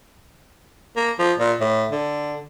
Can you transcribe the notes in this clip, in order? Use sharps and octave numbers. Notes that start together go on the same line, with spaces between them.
A#3
F3
A#2
A2
D3